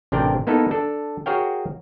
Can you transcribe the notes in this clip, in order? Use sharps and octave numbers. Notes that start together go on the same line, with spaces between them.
A1 C3 D4 A#4 G5
A#3 B3 D#4 E4 A4
D4 A4
F#4 G#4 A#4 C#5 F5 G5